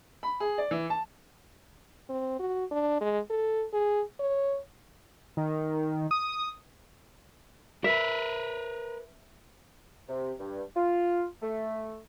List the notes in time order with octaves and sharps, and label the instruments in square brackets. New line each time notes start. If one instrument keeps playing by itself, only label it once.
[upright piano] B5
G#4
D5
E3
A5
[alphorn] C4
F#4
D4
G#3
A4
G#4
C#5
[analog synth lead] D#3
D#6
[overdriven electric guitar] A#4 B4 [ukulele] E5
[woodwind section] C3
G2
F4
A3